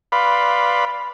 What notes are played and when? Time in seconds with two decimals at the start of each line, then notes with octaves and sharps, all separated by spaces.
0.12 B4 D5 F5 B5 C6